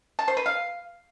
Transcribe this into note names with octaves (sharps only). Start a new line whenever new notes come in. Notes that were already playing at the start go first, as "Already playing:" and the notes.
A5
C5
B4
F5